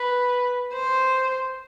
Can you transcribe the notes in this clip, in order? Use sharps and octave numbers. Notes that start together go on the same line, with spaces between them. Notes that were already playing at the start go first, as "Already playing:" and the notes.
Already playing: B4
C5